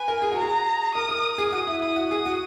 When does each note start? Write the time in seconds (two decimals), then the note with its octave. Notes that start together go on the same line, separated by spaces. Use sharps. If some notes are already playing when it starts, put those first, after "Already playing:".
Already playing: B4 G#5
0.08 A#4
0.22 G#4
0.32 F#4
0.37 G#4 A#5
0.95 A#4 D#6
1.09 A#4
1.38 G#4
1.52 F#4 D#6
1.67 E4
1.82 E4 D#6
1.96 F#4
2.11 G#4 D#6
2.26 F#4